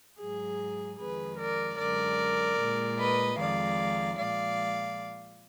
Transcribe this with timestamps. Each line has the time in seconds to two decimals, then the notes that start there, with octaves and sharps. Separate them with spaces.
0.19 G#2 F#3 G#4
0.99 F2 D#3 G#3 G#4 B4
1.39 A#4 D5
1.78 F#2 D3 G#3 A#4 D5
2.58 A#2 G#3
2.98 B4 D#5
3.38 F2 D#3 G#3 D5 F5
4.18 A#2 F3 G#3 D5 F5